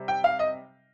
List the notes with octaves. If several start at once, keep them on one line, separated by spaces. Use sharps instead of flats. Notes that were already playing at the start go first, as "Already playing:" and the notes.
Already playing: C3 G3
G5
F5
D#5